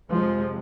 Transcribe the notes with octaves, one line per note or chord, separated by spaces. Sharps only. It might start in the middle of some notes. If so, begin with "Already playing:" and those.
F2 C3 F3 G#3